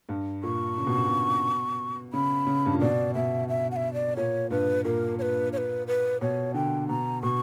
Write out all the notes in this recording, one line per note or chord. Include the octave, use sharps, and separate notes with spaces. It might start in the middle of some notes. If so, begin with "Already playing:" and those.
G2
A#2 C#6
C#3
B2
A#2
B2
C#3 B5
C#3
G2
A#2
B2 D5
B2 E5
E5
F#5
E5
D5
A#2 C#5
G2 B4
A#2 A#4
C#5
B4
C#5
B4
B4
B2 C#5
D3 G5
B2 A#5
B2 C#6